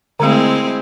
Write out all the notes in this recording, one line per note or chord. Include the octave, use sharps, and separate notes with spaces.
D3 G#3 A3 C4 E4